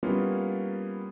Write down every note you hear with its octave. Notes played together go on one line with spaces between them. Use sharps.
G3 A#3 B3 C#4 E4 F4